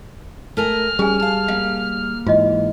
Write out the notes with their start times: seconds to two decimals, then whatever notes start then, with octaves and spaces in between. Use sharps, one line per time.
0.57 A3 A#4 G#5 F6
0.99 G3 C#4 G#4 G#5
1.20 F5 A5
1.48 A#3 F5
2.26 G#2 E3 F4 D#5